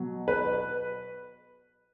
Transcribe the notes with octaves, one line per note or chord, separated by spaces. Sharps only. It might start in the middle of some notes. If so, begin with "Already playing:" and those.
Already playing: B2 F#3 B3
B4